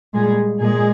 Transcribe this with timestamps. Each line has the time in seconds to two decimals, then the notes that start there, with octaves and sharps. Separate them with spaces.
0.14 A#2 G3 G#3 G#4
0.61 A#2 G#3 G#4